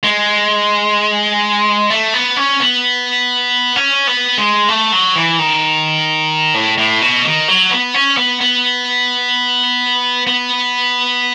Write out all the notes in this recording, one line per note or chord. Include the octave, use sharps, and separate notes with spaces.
G#3
A3
B3
C#4
B3
C#4
B3
G#3
A3
F#3
E3
D#3
A2
A2
B2
D#3
F#3
B3
C#4
B3
B3
B3